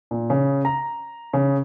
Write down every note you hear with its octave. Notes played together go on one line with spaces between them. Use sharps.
A#2
C#3
A#5
C#3